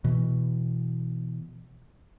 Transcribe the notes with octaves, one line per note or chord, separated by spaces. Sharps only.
B2 E3